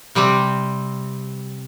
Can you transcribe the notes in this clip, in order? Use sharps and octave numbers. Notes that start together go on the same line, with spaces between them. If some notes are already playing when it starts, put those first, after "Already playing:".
C3 G3 C4 G4